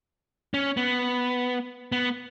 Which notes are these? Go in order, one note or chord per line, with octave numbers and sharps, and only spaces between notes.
C#4
B3
B3